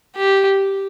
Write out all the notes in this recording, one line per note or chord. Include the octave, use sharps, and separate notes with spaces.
G4